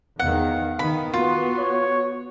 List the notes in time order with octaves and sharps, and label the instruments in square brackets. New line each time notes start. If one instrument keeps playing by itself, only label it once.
[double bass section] E2 D#3 [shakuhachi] F5 [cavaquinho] F#5
[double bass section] D#3 B3 [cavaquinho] B5
[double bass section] B3 [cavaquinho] F4 [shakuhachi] F#4
[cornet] C#5